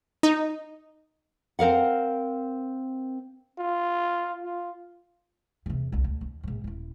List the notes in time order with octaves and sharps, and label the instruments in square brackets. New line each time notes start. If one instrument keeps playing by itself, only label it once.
[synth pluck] D#4
[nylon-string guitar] C4 A#4 F5 F#5
[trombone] F4
F4
[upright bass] E2 C3
C2 D3
D2
D#2
A#1 G#2
D#1 E4